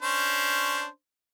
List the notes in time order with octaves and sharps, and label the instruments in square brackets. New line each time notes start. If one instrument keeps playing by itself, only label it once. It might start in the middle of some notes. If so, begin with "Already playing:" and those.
[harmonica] C#4 D4 C5